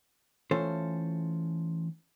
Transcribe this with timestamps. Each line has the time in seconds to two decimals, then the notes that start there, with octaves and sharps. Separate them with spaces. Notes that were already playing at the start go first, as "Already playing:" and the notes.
0.51 E3 A3 C#4 F4 A4 C5